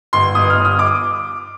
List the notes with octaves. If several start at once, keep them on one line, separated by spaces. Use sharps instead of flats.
G1 C6
G1 D#6
F6
G1
D#6
D6